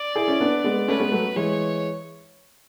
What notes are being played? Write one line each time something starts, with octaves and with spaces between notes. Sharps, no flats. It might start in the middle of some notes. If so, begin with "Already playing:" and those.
Already playing: D5
E4 G#4
C#4 E4
B3 D4
G#3 B3
A3 C#4 B4
G#3 B3
F#3 A3
E3 G#3 C#5